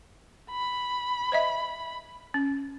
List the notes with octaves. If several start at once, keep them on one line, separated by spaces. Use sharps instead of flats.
B5
C5 D#5 E5
C#4